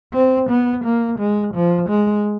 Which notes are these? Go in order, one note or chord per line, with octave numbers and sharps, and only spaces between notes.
C4
B3
A#3
G#3
F3
G#3